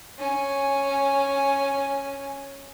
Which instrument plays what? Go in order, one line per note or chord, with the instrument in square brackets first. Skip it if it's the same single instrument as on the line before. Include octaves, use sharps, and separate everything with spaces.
[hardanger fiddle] C#4 G#5